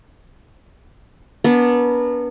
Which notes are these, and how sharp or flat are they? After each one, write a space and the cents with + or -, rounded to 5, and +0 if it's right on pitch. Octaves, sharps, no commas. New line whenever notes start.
B3 -25 D4 -40 A#4 -40